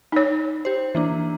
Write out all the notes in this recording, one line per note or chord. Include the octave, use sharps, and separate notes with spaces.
D#4 C#5
G4 C5
E3 A#3 D4